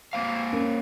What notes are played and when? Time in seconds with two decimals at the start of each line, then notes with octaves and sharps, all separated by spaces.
0.13 A#3 C4 F5
0.53 C#4 A#4